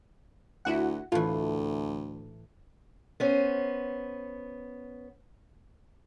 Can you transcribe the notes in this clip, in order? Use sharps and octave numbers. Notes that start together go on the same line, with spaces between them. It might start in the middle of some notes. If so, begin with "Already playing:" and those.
D2 E4 F#4 F#5
D2 A2 E3 F4
B3 C#4 C5